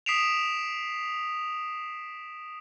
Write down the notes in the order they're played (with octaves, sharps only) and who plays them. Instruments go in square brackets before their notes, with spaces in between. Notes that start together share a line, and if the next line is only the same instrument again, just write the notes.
[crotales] D#6 B6 C7 D7 E7 F7